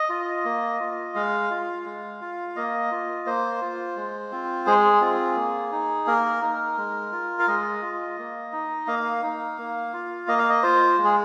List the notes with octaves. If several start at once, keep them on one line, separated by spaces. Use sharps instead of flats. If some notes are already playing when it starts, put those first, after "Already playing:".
Already playing: D#5
F4
A#3
F4
G#3 F5
F4
G#3
F4
A#3 D#5
F4
A#3 C5
F4
G#3
C4 F4
G#3 G#4
C4 F4
A#3
D#4
A#3 A#4
D#4
G#3
F4
F5
G#3 D#5
F4
A#3
D#4
A#3 F5
D#4
A#3
F4
A#3 D#5
F5
D#5
F4 C5
G#3
G#4